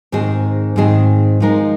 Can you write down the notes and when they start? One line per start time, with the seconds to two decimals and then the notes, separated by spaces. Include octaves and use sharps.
0.12 G#2 D#3 C4 G#4
0.76 G#2 D#3 C4 G#4
1.40 F3 G#3 D#4 A#4